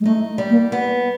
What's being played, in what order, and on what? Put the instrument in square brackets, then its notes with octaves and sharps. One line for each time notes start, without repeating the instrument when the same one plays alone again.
[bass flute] G#3
[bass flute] A3 [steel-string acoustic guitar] D#4
[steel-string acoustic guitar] G3
[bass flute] A#3
[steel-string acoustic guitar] B3